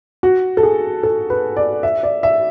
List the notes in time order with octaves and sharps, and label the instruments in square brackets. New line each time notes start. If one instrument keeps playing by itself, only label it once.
[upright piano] F#4
A4
G#4
A4
B4
D5
E5
D5
E5